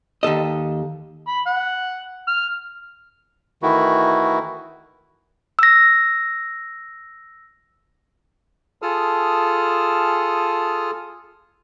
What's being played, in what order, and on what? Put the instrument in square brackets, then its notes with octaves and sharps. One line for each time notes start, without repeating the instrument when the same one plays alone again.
[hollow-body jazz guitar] D#2 C#3 A4 D#5
[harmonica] B5
F#5
F6
[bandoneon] D#3 E3 A3 E4 F#4
[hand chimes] E6 A#6
[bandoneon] F4 G#4 A4 A5 D#6 F6